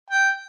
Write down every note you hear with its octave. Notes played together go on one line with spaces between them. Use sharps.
G5